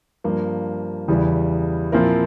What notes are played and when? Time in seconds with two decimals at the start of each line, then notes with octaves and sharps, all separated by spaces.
0.24 G2 F3 A#3
1.08 E2 C#3 E3 G3
1.92 A#2 F3 C4 E4 A#4